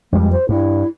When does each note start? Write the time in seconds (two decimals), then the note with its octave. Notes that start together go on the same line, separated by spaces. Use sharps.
0.13 F2 G3 G#3
0.32 C5
0.49 G2 E4